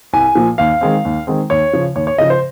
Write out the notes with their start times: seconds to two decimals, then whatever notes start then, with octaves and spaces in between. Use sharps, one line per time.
0.13 C2 G#5
0.35 A#2 F3
0.58 D#2 F5
0.81 D#3 G#3 C4
1.05 D#2
1.27 D#3 G#3 C4
1.50 D#2 C#5
1.73 C#3 F3
1.95 D#2 C#5
2.07 C#5
2.18 C#3 F3 D#5
2.30 C5